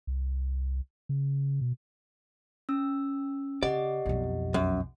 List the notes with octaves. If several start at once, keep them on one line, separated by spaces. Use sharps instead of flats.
C2
C#3
B2
C#4 E6
C#3 G4 D5 D#5 F#5
B1 F2
F#2